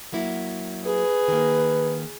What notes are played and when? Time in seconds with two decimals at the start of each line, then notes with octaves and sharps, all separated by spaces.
0.13 F#3 A#3 E4
0.86 G#4 B4
1.28 D#3 A#3